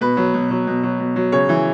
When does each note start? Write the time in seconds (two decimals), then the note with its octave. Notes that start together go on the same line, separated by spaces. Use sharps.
0.01 B2 B4
0.17 F#3
0.34 B2
0.50 F#3
0.67 B2
0.83 F#3
1.00 B2
1.16 F#3
1.32 C#3 C#5
1.49 E3